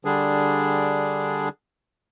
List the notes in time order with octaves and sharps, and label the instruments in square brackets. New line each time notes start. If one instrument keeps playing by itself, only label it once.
[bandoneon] D3 G3 D4 G#4